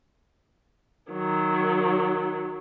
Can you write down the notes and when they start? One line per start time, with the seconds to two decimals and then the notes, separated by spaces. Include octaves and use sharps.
1.12 D#3 F#3